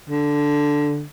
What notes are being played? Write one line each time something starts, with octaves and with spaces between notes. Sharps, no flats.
D3